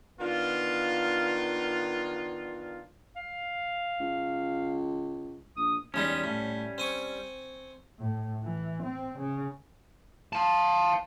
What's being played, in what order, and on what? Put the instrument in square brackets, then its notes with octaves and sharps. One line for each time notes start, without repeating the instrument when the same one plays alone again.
[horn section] D#3 B3 D4 F4
[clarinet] F5
[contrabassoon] C#2
[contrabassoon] A#1 [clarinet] D#6
[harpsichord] E2 G#3 D#4 [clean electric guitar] G3 C#4
[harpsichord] A2
C4 G#5 C#6
[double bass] A2
E3
C4
C#3
[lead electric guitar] F5 A5